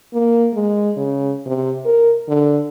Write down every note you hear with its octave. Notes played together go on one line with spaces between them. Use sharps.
A#3
G#3
C#3
C3
A#4
D3